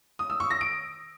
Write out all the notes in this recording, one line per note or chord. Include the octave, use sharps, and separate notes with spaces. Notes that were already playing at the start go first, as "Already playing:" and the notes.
D#6
E6
C#6
A#6
D7